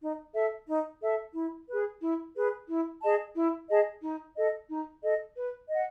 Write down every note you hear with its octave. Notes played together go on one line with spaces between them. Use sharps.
D#4
A4 E5
D#4
A4 E5
E4
G#4 B4
E4
G#4 B4
E4
G#4 D#5 A5
E4
G#4 D#5 A5
D#4
A4 D#5
D#4
A4 D#5
B4
D#5 F#5